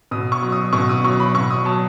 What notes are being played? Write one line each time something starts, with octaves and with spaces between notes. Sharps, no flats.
B2 D#6
C#6
F#3
D#6
B2 C#6
D#6
F#3 C#6
B5
B2 C#6
D#6
F#3 A5